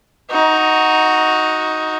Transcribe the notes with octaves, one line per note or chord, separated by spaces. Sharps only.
D#4 F#4